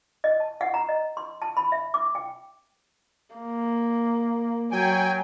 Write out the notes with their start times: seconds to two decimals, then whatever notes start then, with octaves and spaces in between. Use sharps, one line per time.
0.24 D#5
0.40 A5
0.61 F#5
0.74 A#5
0.89 D#5
1.17 C6
1.42 A5
1.57 B5
1.72 E5
1.94 D6
2.15 G5
3.35 A#3
4.72 F#3 G5 G#5